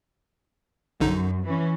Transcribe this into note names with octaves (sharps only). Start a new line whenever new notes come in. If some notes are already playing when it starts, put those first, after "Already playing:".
A#1 F#2 D3 D#4
E3 C#4